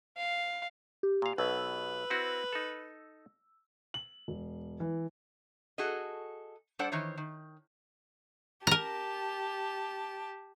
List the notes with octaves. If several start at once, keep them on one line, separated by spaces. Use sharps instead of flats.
F5
G4
A#2 F5
B1 B2 B4 E6
C4 E4 F#4
D#4 A4
F#7
E1
E3
F#4 G#4 A4 D#5
G3 D4 A4 C5 D5 F#5
D#3 E3 C5 C#5
D#3
G4 A#4 A5 A#5